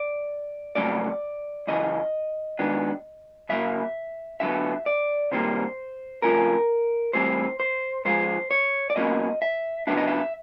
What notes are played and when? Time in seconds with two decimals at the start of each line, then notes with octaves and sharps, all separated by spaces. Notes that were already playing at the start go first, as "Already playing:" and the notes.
Already playing: D5
0.75 F2 C#3 F#3 A3 C#4 D5
1.67 F#2 C#3 E3 D#5
2.59 G#2 D#3 F#3 B3 D4
3.49 C#3 F#3 A#3 E5
4.40 D3 F#3 B3 E5
4.86 D5
5.32 C3 D#3 G3 A#3 C5
6.22 F2 C#3 F3 A3 C#4 A#4
7.13 A2 E3 G3 C4 C5
7.60 C5
8.05 G#2 F3 G#3 C5
8.51 C#5
8.90 D5
8.96 B2 F#3 A#3 C#4 D#5
9.42 E5
9.87 C#3 F#3 B3 D4 E5
9.97 D#5
10.07 E5